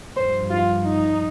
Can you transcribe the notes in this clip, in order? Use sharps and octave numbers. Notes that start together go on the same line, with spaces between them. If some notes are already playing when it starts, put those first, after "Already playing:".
G2 F3 C5
F4
D#4